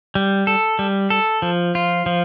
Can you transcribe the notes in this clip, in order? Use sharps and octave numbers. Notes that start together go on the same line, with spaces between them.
G3
A4
G3
A4
F3
F4
F3